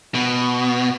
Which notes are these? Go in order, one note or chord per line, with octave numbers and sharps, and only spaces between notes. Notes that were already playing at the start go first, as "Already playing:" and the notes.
B2